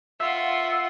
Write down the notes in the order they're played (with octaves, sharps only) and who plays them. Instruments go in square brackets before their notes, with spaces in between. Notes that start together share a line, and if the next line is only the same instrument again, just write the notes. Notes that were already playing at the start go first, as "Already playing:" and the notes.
[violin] F4 F#5 [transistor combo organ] E5